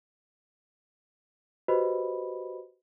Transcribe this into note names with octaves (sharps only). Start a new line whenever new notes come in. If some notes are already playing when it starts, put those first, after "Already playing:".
F#4 G4 B4 C5 D#5 B5